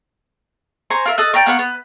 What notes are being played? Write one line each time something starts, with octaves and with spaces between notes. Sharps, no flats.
C5 G#5 A#5 C#6
F4 A#4 E5
A4 D#5 F#6
D5 G5 A#5 C#6
A#3 B3 F#5 C#6
B3